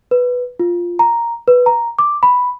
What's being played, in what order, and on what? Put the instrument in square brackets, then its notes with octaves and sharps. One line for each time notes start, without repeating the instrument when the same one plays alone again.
[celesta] B4
F4
A#5
B4
A#5
D6
B5